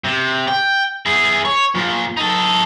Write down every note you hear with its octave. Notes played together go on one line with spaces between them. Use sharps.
C3
G5
E4 G#4
C#5
A#2 F3
D#4 A4